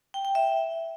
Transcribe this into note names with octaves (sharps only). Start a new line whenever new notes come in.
G5
G5
E5